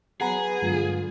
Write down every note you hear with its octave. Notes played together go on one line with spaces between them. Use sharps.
F#3 B3 G#4 F#5 A#5 B5
G2 D3 F#3 G#3 F4